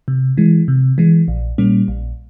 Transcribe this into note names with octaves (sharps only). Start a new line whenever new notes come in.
C3
E3 G#3
C3
E3 G#3
A#1
A#2 G3 A#3 C#4
A#1